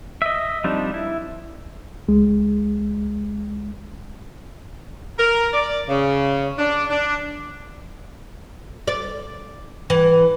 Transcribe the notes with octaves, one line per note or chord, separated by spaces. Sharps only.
D#5 E5
F3 G3 C4 D4 D#4
E4
C#2 G#3
A#4
D5
C#3
D4
D4
D5
E3